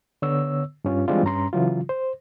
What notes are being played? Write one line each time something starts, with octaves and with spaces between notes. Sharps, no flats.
D3 B3 C#5 E6
G2 C#4 F4
E3 G3 G#3 C4 D4 F4
G2 C#4 A#5 C6
C#3 E3 F#3 F4
C5